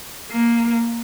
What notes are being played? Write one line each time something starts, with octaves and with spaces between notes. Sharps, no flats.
A#3